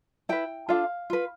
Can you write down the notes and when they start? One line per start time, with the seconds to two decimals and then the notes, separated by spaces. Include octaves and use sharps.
0.29 E4 B4 G5
0.69 D4 F4 A4 F5
1.10 F4 B4